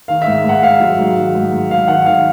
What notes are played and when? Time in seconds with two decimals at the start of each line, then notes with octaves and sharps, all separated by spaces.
0.08 D#3 F5
0.22 E5
0.26 G#2
0.44 G#2 F#5
0.62 G#2 F5
0.80 F#3
0.99 G#2
1.17 D#3
1.35 G#2
1.52 G#2
1.70 G#2 F5
1.88 D#3 F#5
2.06 D#3 F5